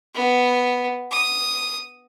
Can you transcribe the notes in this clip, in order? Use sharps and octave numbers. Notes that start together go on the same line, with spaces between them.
B3
D#6